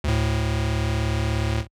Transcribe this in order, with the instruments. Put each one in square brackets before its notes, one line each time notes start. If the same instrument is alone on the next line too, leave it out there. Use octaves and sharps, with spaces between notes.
[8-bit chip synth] D2 A2